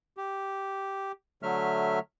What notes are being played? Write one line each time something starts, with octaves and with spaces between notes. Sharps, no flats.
G4
D3 F#3 A3 E5 F6